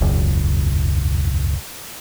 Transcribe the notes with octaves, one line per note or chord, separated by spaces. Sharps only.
E1 C#2 F#2